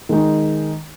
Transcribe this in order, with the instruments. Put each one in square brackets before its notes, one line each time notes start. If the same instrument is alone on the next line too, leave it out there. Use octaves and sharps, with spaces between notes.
[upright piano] D#3 G#3 D#4